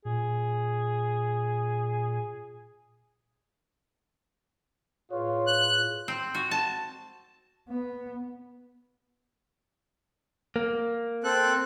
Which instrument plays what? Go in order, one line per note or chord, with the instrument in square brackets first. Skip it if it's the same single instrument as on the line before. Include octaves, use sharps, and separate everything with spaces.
[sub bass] A#2 [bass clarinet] G#4
[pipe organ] A2 G#4 B4 [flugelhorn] F4 [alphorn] C#5
[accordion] F#6
[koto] C4
F#4
A5
[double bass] B3
[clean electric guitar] A#3
[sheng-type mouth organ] C4 A4 F#6